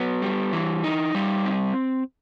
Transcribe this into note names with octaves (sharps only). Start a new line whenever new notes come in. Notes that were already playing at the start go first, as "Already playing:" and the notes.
Already playing: F#3 B3
G3
E3
D#4
G3
C4